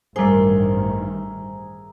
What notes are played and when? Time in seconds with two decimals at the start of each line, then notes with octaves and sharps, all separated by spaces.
0.16 A1 G2 D#3 G3 G#4 A#4 C5 E5